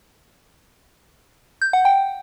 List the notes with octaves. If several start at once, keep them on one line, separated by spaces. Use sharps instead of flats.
G6
F#5
G5